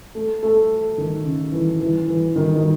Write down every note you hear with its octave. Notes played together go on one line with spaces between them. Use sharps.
A3
A3
D#3
C#3
E3
E3
E3
D#3
D#3